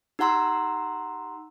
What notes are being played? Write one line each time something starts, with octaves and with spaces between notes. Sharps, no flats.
D#4 G4 F#5 A#5 C6 E6